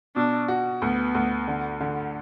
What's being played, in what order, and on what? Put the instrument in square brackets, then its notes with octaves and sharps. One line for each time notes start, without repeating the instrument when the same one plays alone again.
[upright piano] B2 [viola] D4
[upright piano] F#4
[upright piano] D2 [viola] B3
[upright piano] D2
D3
D3